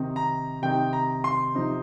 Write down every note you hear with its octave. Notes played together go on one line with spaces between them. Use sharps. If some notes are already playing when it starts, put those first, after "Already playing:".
Already playing: C3 D#3 C4 D#4
A#5
C3 D#3 C4 D#4 G5
A#5
C6
C3 F3 C4 D#4